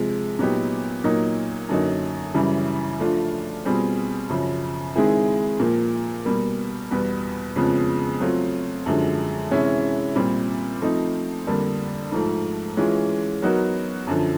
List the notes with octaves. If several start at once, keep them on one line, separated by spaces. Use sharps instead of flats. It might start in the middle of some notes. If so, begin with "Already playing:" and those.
Already playing: C3 F3 G#3
A#2 F#3 B3 D#4 G4
A#2 F#3 A#3 D#4
F#2 D3 F#3 A#3 D#4
F#2 C#3 E3 G3
F3 A3 D4 F4
B2 G3 C4 F4 G#4
F#2 C#3 F3
D#3 G#3 C4 E4 G#4
A#2 F3 A#3
B2 G3 A#3
E2 B2 G3 B3
F2 C#3 F3 G#3 B3
F#3 A3 C4 F4
F#2 D3 F3 G#3
C3 E3 G#3 C#4 E4
A#2 G3 C4
F3 A3 C4 D#4
F2 D3 G3 A#3 D4
G#2 F3 A3
E3 G#3 C#4 F4
F#3 B3 D#4 F#4 A#4
F#2 D3 F3